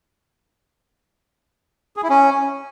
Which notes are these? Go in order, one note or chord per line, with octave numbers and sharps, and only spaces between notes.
G#4
E4
C#4